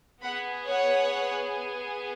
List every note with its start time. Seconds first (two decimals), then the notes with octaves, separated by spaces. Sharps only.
0.22 B3 G#4 F#5 B5
0.66 C#5 F#5